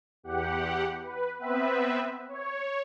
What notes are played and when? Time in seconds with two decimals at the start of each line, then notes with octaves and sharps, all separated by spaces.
0.23 E2 G4 F#5
1.02 B4
1.39 B3 C4 B4 E5
2.28 C#5